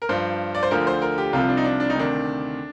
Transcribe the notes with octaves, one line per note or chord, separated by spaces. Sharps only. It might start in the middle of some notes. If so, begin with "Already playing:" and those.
A#4
G2 F3 C5
D5
C5
D2 D3 F3 A#4
C5
A#4
G4
C2 C3 F3 F4
D4
D#4
D4
D4
D#4
D2 C3 D#3 D4